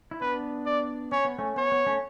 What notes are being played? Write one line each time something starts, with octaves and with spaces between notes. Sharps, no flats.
E4
B3 D4 B4
D5
C#4 C#5
B3
A3 C#4
B3 C#5
B3
A3 C#4